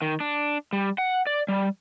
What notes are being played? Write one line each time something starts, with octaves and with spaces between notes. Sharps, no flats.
D#3
D4
G3
F#5
D5
G3